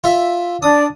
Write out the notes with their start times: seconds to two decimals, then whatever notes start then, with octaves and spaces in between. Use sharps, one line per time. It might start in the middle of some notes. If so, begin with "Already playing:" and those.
0.04 F4 E5
0.62 D4 D5 D#6